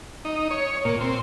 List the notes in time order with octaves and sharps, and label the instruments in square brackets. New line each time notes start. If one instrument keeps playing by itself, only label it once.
[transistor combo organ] D#4
C#5
A#2
C4